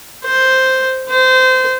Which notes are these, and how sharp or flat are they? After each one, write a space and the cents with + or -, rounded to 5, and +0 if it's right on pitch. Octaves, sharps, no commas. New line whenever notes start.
C5 +0
C5 -25